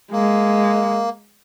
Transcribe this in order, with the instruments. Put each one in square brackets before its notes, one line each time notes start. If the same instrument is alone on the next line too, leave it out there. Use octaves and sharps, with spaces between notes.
[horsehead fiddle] G#3 [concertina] A#3